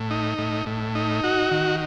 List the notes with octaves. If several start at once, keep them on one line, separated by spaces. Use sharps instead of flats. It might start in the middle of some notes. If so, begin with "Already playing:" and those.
Already playing: A2
D#4
A2
A2
D#4
F#4
D#3